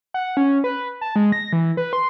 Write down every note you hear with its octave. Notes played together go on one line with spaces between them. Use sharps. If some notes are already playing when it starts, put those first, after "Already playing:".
F#5
C#4
B4
A5
G#3
A#6
E3
B4
C6